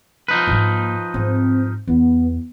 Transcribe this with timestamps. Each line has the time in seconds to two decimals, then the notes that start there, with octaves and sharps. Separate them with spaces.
0.28 F3 D#4 B4
0.47 G#2 A#3
1.14 G#2 C4
1.87 E2 B3